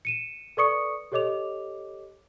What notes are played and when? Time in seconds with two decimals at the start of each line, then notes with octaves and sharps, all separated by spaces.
0.05 C#7 D#7 E7
0.57 A4 B4 D5 C#6 D#6 C#7
1.12 G4 A4 C#5 D#5 D6 F7